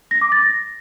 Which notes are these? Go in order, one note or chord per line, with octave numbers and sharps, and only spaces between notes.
A#6
D6
A6
A#6